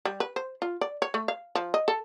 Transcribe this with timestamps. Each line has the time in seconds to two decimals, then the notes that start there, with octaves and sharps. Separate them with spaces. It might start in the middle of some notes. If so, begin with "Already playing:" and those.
0.05 G3
0.20 B4
0.36 C5
0.62 F4
0.81 D5
1.02 C#5
1.14 A3
1.28 F5
1.55 F3
1.74 D#5
1.88 A4